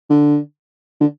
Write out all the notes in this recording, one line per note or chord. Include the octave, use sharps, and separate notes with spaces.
D3
D3